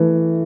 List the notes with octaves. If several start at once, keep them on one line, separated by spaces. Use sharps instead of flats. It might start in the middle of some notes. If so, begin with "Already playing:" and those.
Already playing: E3 A3